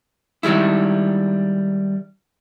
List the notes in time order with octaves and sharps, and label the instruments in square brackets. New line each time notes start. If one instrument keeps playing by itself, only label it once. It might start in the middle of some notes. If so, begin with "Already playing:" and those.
[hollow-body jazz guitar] D#3 G3 G#3 E4